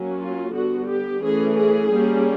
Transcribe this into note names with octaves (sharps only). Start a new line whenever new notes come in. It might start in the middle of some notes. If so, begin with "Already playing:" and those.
Already playing: F#3 A#3 C#4
F4
D3 G3 B3 F#4
G4
E3 A3 C#4 G#4
G#4
G3 A#3 C#4